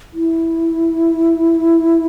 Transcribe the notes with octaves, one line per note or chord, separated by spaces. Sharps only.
E4